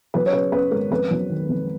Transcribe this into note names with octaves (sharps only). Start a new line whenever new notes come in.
F#3 B4
C#5
C#3 B4
F#2 B4
G#1 A#4
F2 B4
F#3
D#3
F2